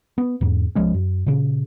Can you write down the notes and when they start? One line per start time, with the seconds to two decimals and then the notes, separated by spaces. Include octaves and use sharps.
0.18 B3
0.41 E2 G#2
0.75 C2 F3 G#3 C#4
0.94 F#2
1.26 A#2 C#3